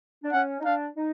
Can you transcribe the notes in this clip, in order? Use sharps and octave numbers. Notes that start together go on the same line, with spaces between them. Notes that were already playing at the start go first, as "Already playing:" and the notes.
D4
C#4 F#5
D#4
D4 F5
D#4